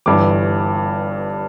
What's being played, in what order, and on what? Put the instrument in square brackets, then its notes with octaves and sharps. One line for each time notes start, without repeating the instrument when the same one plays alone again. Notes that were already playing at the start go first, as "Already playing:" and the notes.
[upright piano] G1 G2 E3 D6